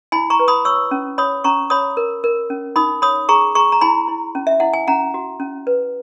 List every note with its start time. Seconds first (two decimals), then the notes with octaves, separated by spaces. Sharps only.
0.12 E4 G#5 B5
0.30 A#5 C#6
0.40 B4
0.48 B5 D#6
0.65 C#5 C#6 E6
0.91 C#4
1.18 C#5 B5 D#6
1.44 C#4 A#5 C#6
1.70 C#5 B5 D#6
1.97 A#4
2.24 A#4
2.50 C#4
2.76 D#4 B5 D#6
3.02 C#5 B5 D#6
3.29 G#4 A#5 C#6
3.55 G#4 A#5 C#6
3.72 A#5
3.81 E4 G#5 B5
4.08 E4
4.35 C#4
4.47 E5
4.60 E4 F#5
4.74 G#5
4.87 C#4 F#5 A#5
5.14 F#4
5.40 C#4
5.67 B4